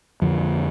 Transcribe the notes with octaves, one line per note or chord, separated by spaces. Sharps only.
F2 D3 F3